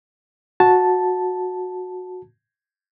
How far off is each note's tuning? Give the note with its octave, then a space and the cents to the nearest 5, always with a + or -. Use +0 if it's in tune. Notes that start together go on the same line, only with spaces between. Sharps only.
F#4 -15 A5 -5